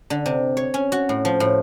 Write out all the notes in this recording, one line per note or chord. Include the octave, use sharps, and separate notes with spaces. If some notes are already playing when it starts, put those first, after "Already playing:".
D3
C3
C#5
C#4
F#4
A2
F3
A2